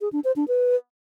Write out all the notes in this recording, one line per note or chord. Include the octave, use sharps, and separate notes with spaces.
G#4
D4
C5
D4
B4